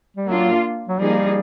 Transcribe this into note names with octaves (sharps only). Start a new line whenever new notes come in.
G3
F#3 A#3 D4 F4
F#3
F3 G3 A#3 D#4 G#4